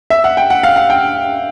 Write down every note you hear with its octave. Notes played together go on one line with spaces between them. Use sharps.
E5
F#5
G5
F#5
F5
F#5
G5